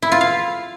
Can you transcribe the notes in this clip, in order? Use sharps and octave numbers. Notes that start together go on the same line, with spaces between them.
E4
F4
F5